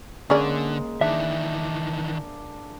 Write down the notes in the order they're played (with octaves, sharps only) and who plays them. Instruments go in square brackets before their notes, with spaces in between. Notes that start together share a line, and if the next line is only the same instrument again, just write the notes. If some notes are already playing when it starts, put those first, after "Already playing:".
[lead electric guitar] D3 [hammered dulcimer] G#3 A#3 [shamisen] C#4 G#4 D5
[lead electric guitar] D#3 E3 [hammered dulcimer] D4 D6 [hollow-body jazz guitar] E5